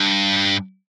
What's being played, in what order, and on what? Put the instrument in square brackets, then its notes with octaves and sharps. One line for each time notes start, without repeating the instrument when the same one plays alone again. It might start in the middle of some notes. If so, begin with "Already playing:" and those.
Already playing: [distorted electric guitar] G2